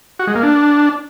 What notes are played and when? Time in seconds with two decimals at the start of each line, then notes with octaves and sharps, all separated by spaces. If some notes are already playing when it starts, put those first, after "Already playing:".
0.19 F#4
0.27 G#3
0.35 A#3
0.43 D4